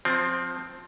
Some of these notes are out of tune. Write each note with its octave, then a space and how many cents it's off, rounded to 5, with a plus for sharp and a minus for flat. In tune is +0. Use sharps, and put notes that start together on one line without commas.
F3 +15 C4 +0